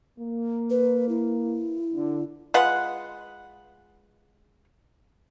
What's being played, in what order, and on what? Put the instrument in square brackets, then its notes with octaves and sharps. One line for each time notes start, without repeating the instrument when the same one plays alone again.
[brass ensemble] A#3
[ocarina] B4
E4
[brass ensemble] D3
[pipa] G#3 F4 B4 F#5